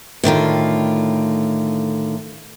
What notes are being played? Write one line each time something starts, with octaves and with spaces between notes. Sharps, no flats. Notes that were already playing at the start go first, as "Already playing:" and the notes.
A2 D3 D#3 F4